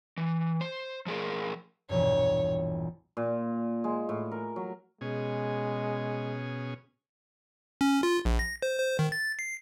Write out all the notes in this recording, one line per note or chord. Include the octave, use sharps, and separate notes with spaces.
E3
C5
F3 G#4 A#4
E1 A#1 G2 C#5
A#2
G#3
A2
A#4
F#3
B2 G#3 C#4 G#4
C#4
F4
A#1
A#6
C5
C5
D#3
A6
C7